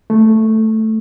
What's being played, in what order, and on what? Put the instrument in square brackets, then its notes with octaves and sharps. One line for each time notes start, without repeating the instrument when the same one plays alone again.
[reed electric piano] A3